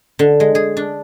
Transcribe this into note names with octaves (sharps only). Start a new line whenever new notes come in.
D3
G#3
G#4
D4